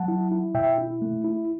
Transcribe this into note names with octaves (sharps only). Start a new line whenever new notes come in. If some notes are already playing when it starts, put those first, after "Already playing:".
Already playing: F#3 F#5 A5
E4
E4
B2 E5 G5
E4
A3
E4